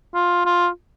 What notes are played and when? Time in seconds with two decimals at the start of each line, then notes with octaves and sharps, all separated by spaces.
0.14 F4
0.46 F4